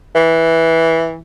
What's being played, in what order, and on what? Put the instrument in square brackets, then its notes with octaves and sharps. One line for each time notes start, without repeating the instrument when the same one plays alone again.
[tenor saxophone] E3